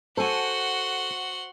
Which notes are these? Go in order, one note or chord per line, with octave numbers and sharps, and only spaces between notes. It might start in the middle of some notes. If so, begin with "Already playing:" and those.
F#4 A4 C5 F#5 G#5 C6